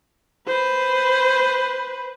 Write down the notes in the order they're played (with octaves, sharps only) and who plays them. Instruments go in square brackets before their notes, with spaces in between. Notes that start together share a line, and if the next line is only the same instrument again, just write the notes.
[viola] B4 C5